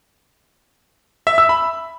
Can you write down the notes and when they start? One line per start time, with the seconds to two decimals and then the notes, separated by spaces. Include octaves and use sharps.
1.27 E5
1.38 E6
1.49 B5